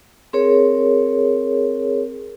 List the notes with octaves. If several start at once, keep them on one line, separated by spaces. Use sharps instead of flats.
C4 G#4 A#4 C#5